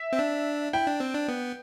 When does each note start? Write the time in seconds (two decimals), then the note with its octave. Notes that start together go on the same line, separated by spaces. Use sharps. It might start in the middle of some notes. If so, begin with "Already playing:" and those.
Already playing: E5
0.13 C4
0.19 D4
0.73 E4 G5
0.86 D4
1.00 C4
1.14 D4
1.28 B3